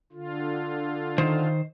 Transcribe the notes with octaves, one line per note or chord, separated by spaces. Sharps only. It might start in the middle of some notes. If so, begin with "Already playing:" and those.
D3 F4
D#3 C5